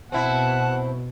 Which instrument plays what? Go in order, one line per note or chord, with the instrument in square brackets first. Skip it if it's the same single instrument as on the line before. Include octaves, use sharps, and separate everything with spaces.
[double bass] B2 [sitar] C4 E4 [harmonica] F#5 [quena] A5